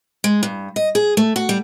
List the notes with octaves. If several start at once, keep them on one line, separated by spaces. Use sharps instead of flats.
G#3
G2
D#5
G#4
A3
F#4
G3